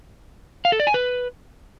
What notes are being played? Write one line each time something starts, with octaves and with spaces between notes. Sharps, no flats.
F5
A4
D5
G#5
B4